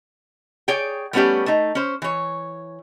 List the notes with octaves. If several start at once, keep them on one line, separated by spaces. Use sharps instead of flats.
G#4 C#5 D5 G5
G3 A3 B3 C#4 G4 D5
A3 D#4
C#4 C5
E3 C#5